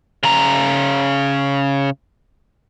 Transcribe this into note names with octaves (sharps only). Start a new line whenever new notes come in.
C#3 A#5